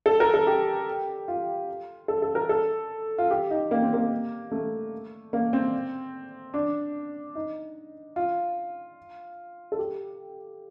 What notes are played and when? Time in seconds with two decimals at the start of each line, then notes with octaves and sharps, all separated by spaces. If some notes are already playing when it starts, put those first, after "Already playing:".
0.06 A4
0.20 A#4
0.34 A4
0.47 G4
1.28 F4
2.08 A4
2.22 A4
2.35 A#4
2.49 A4
3.18 F4
3.31 G4
3.51 D#4
3.71 A#3
3.82 C4
3.93 A#3
4.51 A3
5.33 A#3
5.53 C4
6.54 D4
7.35 D#4
8.16 F4
9.72 A4
9.79 G4